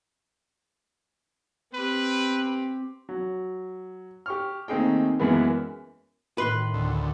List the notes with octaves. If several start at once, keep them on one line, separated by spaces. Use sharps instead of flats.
C4 G4 B4
F#3
G4 C#6 F6
D#2 A3 C4 D#4 G#4 G5
F#2 E3 G#3 A#3 B3
A2 D#3 B4 B5 C6 F#6
D2